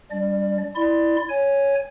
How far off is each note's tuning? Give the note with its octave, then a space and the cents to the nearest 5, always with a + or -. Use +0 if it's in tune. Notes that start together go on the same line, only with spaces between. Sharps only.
G3 +0 D4 -35 D5 +30
E4 +0 D5 +15 C6 +0
C#5 +0 G#5 +0